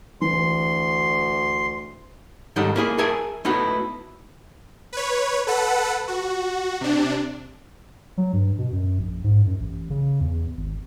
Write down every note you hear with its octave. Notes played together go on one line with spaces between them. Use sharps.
D2 E3 C6
G#2 D#3 G3 D#4 A4 F#5
A#3 E4 G#4
G#4 A#4 E5 G#5 A5
A3 B3 D#4 E4 F#4
B4 C#5
A4 B4 F#5
F#4
C3 D4
F#3
G2
B2
F#2
A#1
G#2
F#2
A1
C#3
E2
G#1